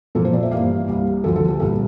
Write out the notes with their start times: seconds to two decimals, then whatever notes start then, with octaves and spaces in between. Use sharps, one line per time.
0.15 A#2 F3 A#3 A4
0.25 C5
0.33 D5
0.43 E5
0.51 G2 E3 A#3 F5
0.88 C2 C3 G3 A#3
1.24 D2 D3 F3 A4
1.36 A4
1.48 G4
1.60 C2 A#2 G3 A4